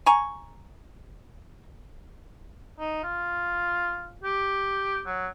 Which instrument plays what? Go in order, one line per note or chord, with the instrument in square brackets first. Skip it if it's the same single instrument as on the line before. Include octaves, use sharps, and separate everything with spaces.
[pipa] G#5 A#5 C#6
[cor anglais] D#4
F4
G4
F#3